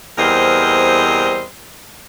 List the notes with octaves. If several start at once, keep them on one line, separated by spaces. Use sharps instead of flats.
E2 G3 C4 A#4 C5 D#5